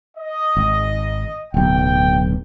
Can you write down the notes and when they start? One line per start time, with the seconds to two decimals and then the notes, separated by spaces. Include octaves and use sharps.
0.17 D#5
0.57 G#1
1.54 D1 B1 G5